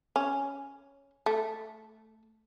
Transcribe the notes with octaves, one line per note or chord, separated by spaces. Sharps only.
C#4
A3